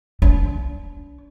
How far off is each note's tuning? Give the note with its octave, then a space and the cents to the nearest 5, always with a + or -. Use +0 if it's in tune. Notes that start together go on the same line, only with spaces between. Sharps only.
D4 -40